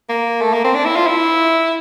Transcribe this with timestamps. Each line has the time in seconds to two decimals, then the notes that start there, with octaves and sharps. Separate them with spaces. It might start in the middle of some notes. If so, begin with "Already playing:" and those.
0.09 A#3
0.42 A3
0.53 A#3
0.64 C4
0.75 D4
0.85 E4
0.96 F4
1.07 E4